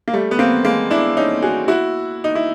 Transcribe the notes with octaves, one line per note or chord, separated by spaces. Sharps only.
A#3
G3 A3
B3
A#3 C4
G#3 A#3
D4 E4
C#4 D#4
F#4 G#4
E4 F#4
D#4
E4